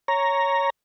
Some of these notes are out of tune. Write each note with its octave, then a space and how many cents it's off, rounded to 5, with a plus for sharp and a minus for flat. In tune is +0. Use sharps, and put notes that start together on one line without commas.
C#5 +0 A#5 +0